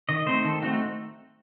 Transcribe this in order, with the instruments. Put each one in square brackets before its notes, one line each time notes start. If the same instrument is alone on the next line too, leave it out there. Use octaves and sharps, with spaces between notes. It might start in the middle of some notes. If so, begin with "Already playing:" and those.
[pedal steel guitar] D#3 D#5
A3 C4 D#4 C5
D#3 A4
A3 C4 D#4 F#4